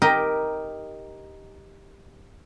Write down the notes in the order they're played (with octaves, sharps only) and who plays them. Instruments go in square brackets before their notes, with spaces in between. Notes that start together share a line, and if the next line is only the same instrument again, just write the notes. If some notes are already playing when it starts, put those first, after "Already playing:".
[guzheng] D#4 G4 A#4 G5